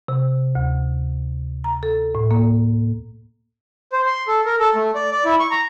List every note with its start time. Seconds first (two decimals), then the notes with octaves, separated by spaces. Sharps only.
0.08 C3
0.55 D2
1.64 A#5
1.83 A4
2.15 A2
2.31 A#3
3.92 C5
4.06 C6
4.28 A4
4.46 A#4
4.60 A4
4.75 A3
4.95 D5
5.12 D5
5.25 E4
5.40 C#6
5.51 A#5